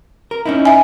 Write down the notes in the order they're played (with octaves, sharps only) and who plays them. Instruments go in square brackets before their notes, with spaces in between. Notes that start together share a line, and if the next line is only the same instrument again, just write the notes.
[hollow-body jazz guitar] A#4
C#4 D#4 E4
[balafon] E5 G#5